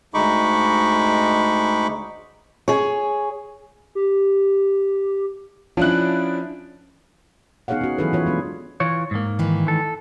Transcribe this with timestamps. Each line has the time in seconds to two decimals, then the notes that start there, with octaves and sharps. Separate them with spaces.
0.14 D2 G#3 D#4 B5 C#6 D6
2.68 G#4 C#5
3.95 G4
5.77 F3 C#4 D4 E4 F#6 D7
7.68 B3 D#4 G#4 C#5 F5 F#5
7.81 C#4 F#4
7.98 E3 F#3 E4 G#4 A4 B4
8.13 E3 F4 C#5
8.26 G#3 B3 D4
8.80 E3 F4 C#5
9.11 G#2 A#3
9.39 D#3 E3
9.68 A4